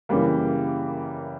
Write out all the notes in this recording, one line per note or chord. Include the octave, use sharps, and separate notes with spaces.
F#2 C#3 E3 G3 A#3